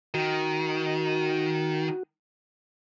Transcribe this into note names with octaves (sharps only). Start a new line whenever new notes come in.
D#3 F#4